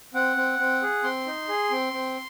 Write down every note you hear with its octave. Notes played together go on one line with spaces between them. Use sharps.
C4 F#5
C4
C4
G#4
C4 C6
D#4
G#4
C4
C4